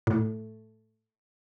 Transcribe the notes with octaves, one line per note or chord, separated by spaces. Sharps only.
A2